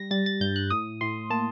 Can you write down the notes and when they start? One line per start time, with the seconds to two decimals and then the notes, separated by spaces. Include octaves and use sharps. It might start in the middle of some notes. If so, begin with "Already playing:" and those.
Already playing: G3 A#6
0.11 G3 A6
0.26 A6
0.40 G2 G6
0.56 F#6
0.70 A2 D#6
1.01 A2 C6
1.30 A#3 A5